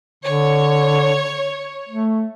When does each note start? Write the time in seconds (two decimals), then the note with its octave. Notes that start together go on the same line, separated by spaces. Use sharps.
0.24 D3 C#5
1.89 A3